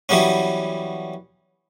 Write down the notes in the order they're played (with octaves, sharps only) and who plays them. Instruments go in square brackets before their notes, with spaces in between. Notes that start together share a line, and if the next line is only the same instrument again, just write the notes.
[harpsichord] E3 F#3 G3 B3 C#4